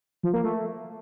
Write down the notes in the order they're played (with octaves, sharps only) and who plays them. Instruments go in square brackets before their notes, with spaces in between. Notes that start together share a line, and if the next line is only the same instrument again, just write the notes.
[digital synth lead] F3
A#3
A3